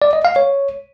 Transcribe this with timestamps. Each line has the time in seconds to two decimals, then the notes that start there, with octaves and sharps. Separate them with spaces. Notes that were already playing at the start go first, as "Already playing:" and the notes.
0.02 D5
0.13 D#5
0.25 F5
0.36 C#5